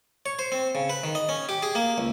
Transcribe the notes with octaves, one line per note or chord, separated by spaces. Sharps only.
C#5
C5
C4
C#3
B4
D#3
D#5
C#4
G4
G#4
A#3
C#2